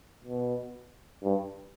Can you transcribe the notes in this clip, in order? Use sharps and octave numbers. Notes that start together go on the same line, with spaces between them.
B2
G2